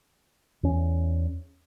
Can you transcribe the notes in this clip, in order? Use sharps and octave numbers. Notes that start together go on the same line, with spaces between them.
E2 C#4